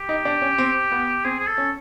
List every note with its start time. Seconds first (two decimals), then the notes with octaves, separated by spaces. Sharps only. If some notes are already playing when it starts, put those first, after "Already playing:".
Already playing: G4
0.09 D#4
0.25 D4
0.42 C#4
0.58 C4
0.92 B3
1.25 C4 G#4
1.39 G#4
1.47 A4
1.58 C#4